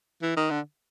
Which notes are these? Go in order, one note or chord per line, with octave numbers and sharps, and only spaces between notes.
E3
D#3
D3